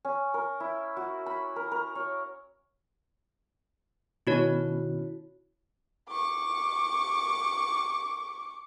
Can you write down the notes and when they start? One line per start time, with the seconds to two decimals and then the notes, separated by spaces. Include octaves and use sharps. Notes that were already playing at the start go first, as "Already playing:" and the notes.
0.05 C#4
0.34 A#4
0.60 E4
0.97 F#4
1.26 B5
1.56 A#4
1.72 A#4
1.95 C#5
4.27 B2 D#3 C#4 E4 F#4 C#5
6.09 C#6 D6